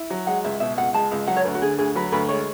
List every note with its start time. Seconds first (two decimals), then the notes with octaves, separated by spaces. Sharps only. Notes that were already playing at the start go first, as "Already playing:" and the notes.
Already playing: E4
0.10 F#3
0.27 G#3 F#5
0.44 C#2 E5
0.60 B2 E5
0.78 C#2 F#5
0.94 G#3 A5
1.11 C#2
1.28 F#3 F#5
1.36 C#5
1.44 D2 B4
1.55 F#4
1.62 D3 G#4
1.78 D2 G#4
1.95 F#3 B4
2.12 D2 B4
2.29 G#3 C#5